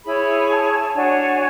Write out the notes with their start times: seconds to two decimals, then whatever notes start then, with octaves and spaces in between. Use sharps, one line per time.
0.05 E4 G#4 C#5 B5
0.51 A5
0.95 D4 F#4 C#5 G#5